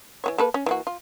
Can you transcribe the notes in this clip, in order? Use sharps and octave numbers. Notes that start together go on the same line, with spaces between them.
E3 B3 C#5
A#3 A4 B4
C#4
E3 A#3 F#4
F4